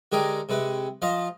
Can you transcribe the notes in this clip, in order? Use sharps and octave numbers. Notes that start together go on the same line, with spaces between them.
D3 G#3 G4 G#4 A#4
C3 G#3 B4
F3 F4 D#5 F5